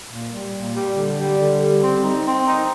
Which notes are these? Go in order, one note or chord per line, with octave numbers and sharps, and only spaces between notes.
A#2
G3
A#2
G3
D3
G3
D3
G3
C4
D#4
C4
D#4